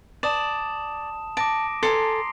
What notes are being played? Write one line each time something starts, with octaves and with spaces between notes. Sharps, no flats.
D5 A5 D#6 E7
A5 D6 A#6 D7
A4 G#5 A#5 C6 C7